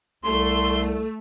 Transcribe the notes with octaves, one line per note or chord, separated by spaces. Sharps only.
C2 A3 C6